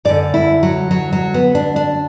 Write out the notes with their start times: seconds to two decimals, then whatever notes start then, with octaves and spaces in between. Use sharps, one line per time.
0.05 F#2 D3 D5
0.34 E4
0.63 F#3
0.91 F#3
1.12 F#3
1.34 B3
1.55 D4
1.76 D4